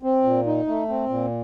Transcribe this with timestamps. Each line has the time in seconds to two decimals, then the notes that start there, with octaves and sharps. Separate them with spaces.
0.03 C4
0.24 A#2
0.46 D#4
0.67 A3
0.89 C4
1.09 A#2